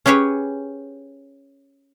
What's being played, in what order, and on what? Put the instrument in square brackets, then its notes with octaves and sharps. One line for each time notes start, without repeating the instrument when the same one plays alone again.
[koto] C#4 G4 G#4 B4 C#5